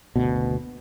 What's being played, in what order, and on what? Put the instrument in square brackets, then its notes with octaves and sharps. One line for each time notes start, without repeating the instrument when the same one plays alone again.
[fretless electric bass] F#1 D2 B2